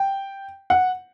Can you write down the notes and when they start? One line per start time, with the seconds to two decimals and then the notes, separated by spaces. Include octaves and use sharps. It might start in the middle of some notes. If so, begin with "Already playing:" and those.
Already playing: G5
0.70 F#5